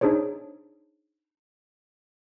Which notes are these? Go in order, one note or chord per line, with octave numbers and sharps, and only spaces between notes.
D4 D#4 G#4 C5 C#5